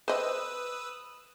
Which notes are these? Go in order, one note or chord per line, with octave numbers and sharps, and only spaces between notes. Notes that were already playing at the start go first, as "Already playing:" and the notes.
B4 C5 D#5 D#6 E6